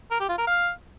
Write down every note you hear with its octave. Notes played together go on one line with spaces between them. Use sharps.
A#4
G4
F4
A#4
F5